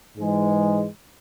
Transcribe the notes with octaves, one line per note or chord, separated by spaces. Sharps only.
G#2 E3 G#3